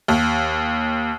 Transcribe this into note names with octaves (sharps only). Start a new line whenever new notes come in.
D#2